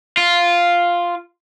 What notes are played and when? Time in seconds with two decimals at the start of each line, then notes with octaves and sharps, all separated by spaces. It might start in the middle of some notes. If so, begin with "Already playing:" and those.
0.17 F4